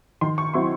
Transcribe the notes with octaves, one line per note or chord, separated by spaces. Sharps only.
D#3 C6
C#6
F#3 C4 E4 C6